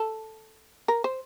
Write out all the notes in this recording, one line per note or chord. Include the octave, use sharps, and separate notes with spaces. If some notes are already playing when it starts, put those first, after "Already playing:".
Already playing: A4
A#4
C5